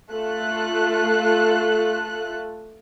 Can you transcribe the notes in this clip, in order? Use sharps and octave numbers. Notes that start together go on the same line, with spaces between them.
A3 F4 A4 F#6